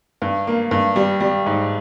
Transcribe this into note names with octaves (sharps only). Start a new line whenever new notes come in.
G2
A#3
G2
G3
G3
G#2